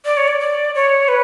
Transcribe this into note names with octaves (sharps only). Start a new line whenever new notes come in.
D5
C#5
D5
D5
C#5
B4